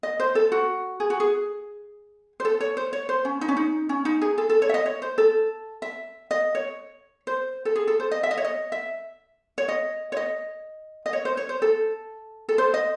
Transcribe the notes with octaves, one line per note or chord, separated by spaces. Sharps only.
D#5
C5
A4
F#4
G#4
F#4
G#4
C5
A4
C#5
C5
C#5
C5
C#4
D#4
C#4
D#4
C#4
D#4
G#4
A4
A4
C#5
E5
D#5
C#5
C5
A4
E5
D#5
C#5
C5
A4
G#4
A4
C5
D#5
E5
D#5
C#5
D#5
E5
C#5
D#5
C#5
D#5
D#5
C#5
C5
C#5
C5
A4
A4
C5
D#5